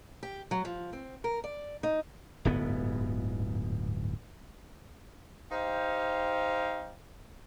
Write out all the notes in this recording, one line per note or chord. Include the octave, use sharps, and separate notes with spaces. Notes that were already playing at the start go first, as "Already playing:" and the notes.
G4
F#3
F3
C4
A#4
D5
D#4
D1 G1 G#2 B3
D#4 G4 C5 F5 G5